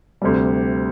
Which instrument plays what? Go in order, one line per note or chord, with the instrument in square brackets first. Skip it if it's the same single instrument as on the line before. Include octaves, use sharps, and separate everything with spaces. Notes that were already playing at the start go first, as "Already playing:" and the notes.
[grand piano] D2 C3 G3